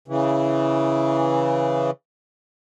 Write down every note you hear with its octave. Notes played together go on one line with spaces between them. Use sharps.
C#3 E3